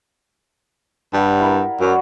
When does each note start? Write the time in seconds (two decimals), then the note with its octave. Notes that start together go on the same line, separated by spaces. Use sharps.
1.13 G2 G3 D5 F#5
1.40 E4 A#4
1.80 F#2 F#4 C#5 D5